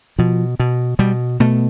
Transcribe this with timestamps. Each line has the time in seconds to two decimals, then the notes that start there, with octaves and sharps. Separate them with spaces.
0.19 B2 F3
0.60 B2
0.99 B2 G3
1.40 B2 A3